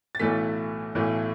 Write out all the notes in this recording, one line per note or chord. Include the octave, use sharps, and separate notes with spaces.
A6
B1 A2 E3 A3 B6
B1 A2 E3 A3